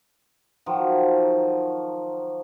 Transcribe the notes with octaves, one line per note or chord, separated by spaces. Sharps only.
D#3 F3 F#3